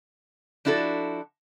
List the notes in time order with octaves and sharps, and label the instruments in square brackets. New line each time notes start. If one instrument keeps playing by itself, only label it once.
[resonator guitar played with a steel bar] F3 D4 E4 F#4 A4